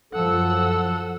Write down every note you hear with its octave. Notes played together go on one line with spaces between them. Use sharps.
F#2 F3 A4 F#5 E6